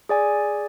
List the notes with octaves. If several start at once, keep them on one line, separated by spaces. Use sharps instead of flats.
G#4 D5 G#5